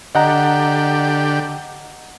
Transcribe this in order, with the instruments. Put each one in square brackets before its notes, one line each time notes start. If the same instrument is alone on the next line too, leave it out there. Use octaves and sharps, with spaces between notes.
[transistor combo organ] D3 G4 [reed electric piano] D#5 F#5 A#5